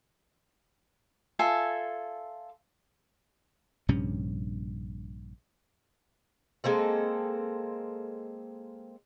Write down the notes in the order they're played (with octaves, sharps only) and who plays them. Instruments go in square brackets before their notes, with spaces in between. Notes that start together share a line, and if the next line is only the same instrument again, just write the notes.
[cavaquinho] F4 A4 E5 G#5
[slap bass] A#1 G2 C3 C#4
[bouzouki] G#3 A#3 C4 A4